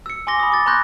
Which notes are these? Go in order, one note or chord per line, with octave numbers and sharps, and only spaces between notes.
E6 C#7
G#5 C6 D6 A#6 G7
B5 D#6
D6 A6
A#5 C6 C#6 F#6 G6 A#6